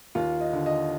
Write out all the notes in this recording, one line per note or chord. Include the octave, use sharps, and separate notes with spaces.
D#2 F4
D#5
D3
D#5